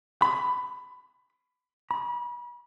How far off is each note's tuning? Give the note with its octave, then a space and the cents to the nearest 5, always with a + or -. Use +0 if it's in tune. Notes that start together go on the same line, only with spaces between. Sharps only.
B5 +20
B5 -35